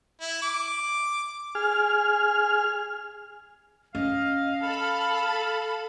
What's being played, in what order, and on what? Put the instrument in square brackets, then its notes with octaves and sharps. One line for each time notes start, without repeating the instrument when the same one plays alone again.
[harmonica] E4
D6
[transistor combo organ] G#4 F6
[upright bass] C#4 [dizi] D#5 [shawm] F5
[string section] A4 [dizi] B5